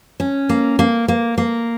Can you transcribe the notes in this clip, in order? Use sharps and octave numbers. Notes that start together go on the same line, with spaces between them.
C#4
A#3
A#3
A#3
A#3